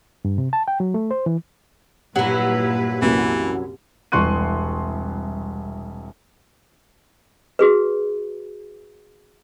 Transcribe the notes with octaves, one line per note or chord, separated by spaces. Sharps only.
G2
C3
A5
G5
F#3
A3
C5
E3
G2 A#2 F#3 E4 B4
C2 F#2 E3 A#3
E1 C2 C6 C#6 F#6 D#7
F#4 G#4 B4